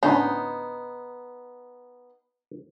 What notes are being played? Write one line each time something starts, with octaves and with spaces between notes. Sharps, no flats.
A2 D3 B3 C#4 D#4 C5